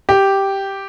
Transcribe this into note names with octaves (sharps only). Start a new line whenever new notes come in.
G4